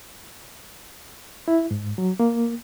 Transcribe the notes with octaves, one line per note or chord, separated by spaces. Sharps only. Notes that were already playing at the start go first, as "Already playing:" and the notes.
E4
G#2
F#3
A#3